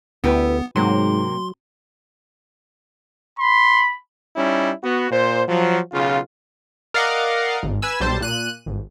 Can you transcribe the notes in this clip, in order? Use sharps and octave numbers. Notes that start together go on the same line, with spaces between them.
D2 B3 E4 G4 B4
G#2 C3 F#3 A#3 C6
B5 C6
G3 C#4 D#4 E4
B3 F#4
A#2 C5
F3 F#3
B1 C#3 F4
A#4 D5 D#5 F5 F#5
G#1
B4 G#5 E6
B1 G3 C5 A5
A#2 F#6 D#7
G#1